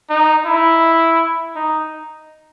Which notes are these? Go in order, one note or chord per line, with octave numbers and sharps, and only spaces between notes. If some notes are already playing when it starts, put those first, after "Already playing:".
D#4
E4
D#4